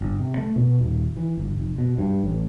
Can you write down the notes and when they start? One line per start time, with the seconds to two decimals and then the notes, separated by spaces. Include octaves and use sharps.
0.01 G1
0.19 C3
0.38 A3
0.56 B2
0.79 D#1
1.17 E3
1.37 G1
1.58 F1
1.78 B2
1.98 G2
2.24 A1